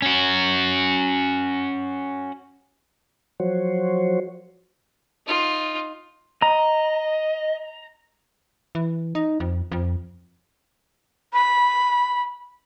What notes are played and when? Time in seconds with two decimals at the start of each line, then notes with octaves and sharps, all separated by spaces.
0.02 C#4 F#4
3.40 F3 F#3 F#4 C5 C#5
5.27 D#4 F4
6.42 D#5 A#5
8.75 E3
9.15 D#4
9.40 F2
9.72 F2
11.33 B5